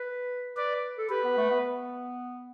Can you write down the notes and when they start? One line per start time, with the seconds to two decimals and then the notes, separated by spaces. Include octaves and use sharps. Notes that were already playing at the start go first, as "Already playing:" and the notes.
Already playing: B4
0.56 B4 D5
0.98 A4
1.10 G4 B4
1.24 B3
1.37 A3
1.51 B3